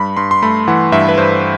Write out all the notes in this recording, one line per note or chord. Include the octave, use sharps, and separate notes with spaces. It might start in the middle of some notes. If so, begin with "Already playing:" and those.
Already playing: G2 B5
G2 C6
C6
A3 B5
E3 F#5
G2 E5
B4
G2 C5